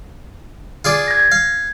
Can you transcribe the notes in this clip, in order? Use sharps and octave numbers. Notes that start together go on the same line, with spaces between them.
F4 G#4 D5
G#6 A#6
G#6
F5